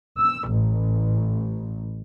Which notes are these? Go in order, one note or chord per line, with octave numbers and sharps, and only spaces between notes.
E6
A1